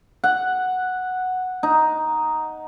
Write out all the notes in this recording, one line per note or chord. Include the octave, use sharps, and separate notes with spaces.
F#5
D#4